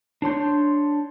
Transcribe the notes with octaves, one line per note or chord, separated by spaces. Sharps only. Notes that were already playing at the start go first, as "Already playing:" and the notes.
D4 C#5 C6 G6